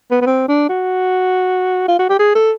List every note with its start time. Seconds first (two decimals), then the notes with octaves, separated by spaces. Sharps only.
0.11 B3
0.22 B3
0.27 C4
0.48 D4
0.69 F#4
1.88 F4
1.99 F#4
2.09 G4
2.19 G#4
2.35 A4